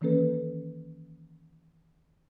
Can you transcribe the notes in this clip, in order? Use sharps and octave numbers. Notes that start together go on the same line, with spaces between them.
D#3 E3 A#3 C#4 A4 B4